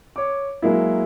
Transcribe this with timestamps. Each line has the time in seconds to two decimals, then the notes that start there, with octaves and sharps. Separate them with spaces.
0.16 C#5 D6
0.62 F#3 G#3 A#3 E4